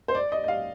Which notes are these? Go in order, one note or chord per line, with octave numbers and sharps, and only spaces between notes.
C5
D5
D#5
D#5
F5